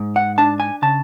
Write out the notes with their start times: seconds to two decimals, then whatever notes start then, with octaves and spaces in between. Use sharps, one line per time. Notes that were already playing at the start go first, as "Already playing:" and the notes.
Already playing: G#2
0.16 F#5
0.38 D4 A5
0.60 G#5
0.82 C#3 A5